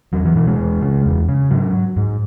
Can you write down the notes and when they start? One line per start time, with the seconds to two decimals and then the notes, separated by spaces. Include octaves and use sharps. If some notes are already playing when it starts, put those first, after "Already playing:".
0.13 E2 F#3
0.25 E3
0.36 B2 E3
0.47 G#3
0.59 E2
0.82 C#3
1.06 E2
1.29 C#3
1.50 G#2 F#3
1.97 G#2